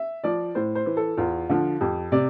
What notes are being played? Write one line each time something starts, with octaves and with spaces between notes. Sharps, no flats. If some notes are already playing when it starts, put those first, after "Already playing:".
Already playing: E5
F3 D5
A2 C5
C5
E3
A4
E2 F4
D3 F3
F2 G4
C3 D5